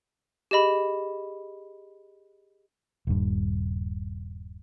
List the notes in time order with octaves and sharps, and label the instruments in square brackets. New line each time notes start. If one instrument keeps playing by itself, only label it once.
[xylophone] G4 G#4 D#5 B5
[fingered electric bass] D#1 G2